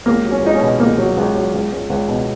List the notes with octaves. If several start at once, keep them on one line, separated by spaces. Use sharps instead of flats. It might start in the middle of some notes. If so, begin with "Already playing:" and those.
C#2 A#3
F#3
C#4
C#2 D#4
C#4
B2
C#2 A#3
F#3
C#2
F#3
C#2
C#2
C#2
B2